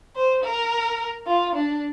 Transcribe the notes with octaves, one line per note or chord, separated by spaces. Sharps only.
C5
A#4
F4
D4